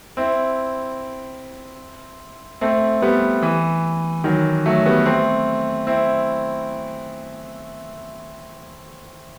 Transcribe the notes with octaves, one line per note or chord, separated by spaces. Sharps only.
C4 E4
A3 C4
G3 B3
E3
D#3 F#3
F#3 A3
G3 B3
A3 C4
C4 E4